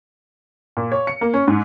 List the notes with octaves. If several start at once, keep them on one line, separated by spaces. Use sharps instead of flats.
A#2
C#5
C#7
A#3
C#4
G#2